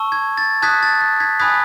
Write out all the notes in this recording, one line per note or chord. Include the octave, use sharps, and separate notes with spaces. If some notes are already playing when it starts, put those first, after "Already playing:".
Already playing: A5 C#6 E6
G#6
A6
A5 D#6 F#6 G#6 B6
A6
A6
G#6 B6
G#5 B5 D#6 F#6 G#6 B6